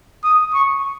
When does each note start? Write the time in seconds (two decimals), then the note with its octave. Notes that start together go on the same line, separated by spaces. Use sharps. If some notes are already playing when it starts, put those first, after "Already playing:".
0.24 D#6
0.54 C#6